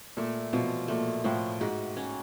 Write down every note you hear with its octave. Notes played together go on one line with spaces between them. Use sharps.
A#2 A3
B2 F3
A#2 A3
A2 F3
G#2 F#4
C#4